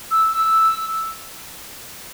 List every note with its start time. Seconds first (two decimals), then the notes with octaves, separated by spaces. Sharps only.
0.11 E6
0.34 E6